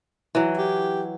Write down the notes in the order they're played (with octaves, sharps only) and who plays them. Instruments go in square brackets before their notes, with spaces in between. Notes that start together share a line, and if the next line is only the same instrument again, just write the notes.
[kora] E3 F#3
[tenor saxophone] G4